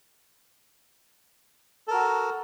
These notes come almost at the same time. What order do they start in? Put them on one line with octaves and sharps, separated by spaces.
A4 A#4 F#4